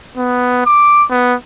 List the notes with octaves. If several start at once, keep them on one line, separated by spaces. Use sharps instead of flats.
B3
D6
B3